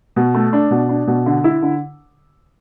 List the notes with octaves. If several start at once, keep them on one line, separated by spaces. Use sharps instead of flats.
B2
A3
D4
B2
D4
B2
D3
E4
D3